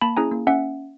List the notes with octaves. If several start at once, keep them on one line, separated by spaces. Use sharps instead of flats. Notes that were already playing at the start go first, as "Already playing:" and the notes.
A#3 A5 B5
C#4 E4 G#4 G#5 A#5
A#3
C#4 E5 F#5